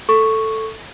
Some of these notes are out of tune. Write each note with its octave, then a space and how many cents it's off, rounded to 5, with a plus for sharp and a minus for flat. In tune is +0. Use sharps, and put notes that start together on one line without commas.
A4 +5 C#6 +0